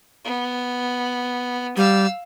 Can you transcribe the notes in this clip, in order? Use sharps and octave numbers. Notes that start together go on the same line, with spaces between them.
B3
G3 F5 E6